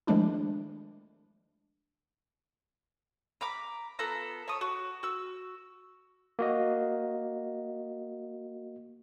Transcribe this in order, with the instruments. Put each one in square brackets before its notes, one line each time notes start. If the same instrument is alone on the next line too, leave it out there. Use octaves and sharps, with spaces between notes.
[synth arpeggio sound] D#3 F3 G#3 A3 D4 E4
[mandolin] A#5 B5 D6
B3 F4 A4 A#5
C#5 A5 C#6 D#6
F#4
F#4 E6
[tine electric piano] A#3 F#4 D#5